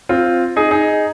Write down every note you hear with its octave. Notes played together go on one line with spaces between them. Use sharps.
C4 F4
D#4 G#4
D#4 G#4